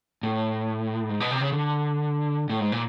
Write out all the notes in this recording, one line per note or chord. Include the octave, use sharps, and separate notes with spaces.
A2
G#2
B2
C3
C#3
D3
A2
G#2
A#2